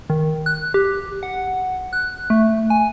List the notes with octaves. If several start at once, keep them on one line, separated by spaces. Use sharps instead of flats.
D#3
F#6
G4
F#5
F#6
A3
G#5